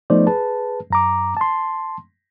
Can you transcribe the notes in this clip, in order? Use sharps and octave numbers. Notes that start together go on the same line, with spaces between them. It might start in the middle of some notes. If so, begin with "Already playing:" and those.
F3 A3 B3 D#4 C5 D5
G#4 B4 A5
F#2 A#5 D6
A5 C6